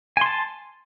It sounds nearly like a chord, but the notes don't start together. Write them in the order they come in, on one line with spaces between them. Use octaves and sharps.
G#5 C6 A5